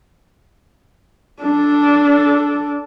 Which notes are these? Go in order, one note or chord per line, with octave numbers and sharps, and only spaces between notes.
D4 A4